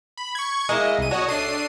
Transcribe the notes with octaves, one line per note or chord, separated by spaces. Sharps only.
B5
C#6 G#6
G#3 A#3 E4 D#5
C2 D#7
D4 F#4 C#5 D#5
A3 D4 C7 D#7